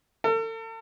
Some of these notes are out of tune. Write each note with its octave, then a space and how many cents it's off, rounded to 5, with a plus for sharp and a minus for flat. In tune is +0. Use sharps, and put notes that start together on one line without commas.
A4 +40